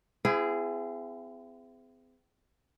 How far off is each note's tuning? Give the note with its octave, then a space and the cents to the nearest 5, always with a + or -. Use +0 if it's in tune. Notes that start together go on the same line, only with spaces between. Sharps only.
C4 -40 E4 +35 G#4 +0